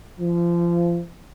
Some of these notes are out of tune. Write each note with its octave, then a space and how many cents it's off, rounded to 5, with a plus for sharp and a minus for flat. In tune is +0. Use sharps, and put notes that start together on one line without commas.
F3 -25